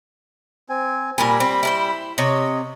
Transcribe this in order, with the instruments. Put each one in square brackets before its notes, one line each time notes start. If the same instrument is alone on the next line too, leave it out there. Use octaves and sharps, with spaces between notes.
[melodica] C4 G#5
[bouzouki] A#2 A#4 G#5 [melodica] G3 B5
[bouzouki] C4
E4 A#4 C5
[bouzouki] C3 C#5 [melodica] D#5